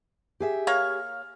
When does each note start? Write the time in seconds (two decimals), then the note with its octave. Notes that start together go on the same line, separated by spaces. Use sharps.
0.40 G4 G#4 E5
0.67 A#3 C#5 F5